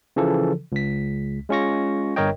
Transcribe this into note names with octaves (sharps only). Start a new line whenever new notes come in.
C#3 E3 F3 A4
C#2 B6
G#3 C#4 F4 C#6 A#6
G1 G2 A#4 C#5 D#5 G5